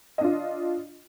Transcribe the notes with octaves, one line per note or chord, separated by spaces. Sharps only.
D4 F4 D#5